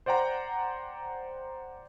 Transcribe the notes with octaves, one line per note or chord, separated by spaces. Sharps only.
C5 D5 F#5 G5 A#5